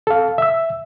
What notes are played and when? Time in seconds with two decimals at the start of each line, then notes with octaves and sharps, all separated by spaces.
0.07 A4 F5
0.38 E5 E6